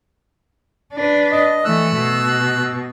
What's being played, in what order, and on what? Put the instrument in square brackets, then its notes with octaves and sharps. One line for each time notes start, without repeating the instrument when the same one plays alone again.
[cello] D4 B4
[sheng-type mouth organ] D#5
[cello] E3 A3 [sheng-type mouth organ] E6 F#6
[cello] B2